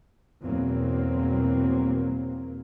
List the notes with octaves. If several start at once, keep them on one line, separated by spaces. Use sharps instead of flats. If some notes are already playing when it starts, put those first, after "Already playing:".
E2 B2 F#3 A#3 C4